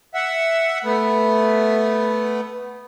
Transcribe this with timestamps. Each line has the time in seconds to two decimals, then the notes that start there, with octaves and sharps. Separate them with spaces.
0.14 E5 F#5
0.84 A3 B3